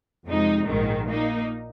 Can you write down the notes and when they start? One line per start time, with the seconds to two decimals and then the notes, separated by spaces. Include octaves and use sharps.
0.26 F2 C3 G#3 D#4
0.66 A#1 G#2 D#3 G#3
1.07 A#2 A#3 D#4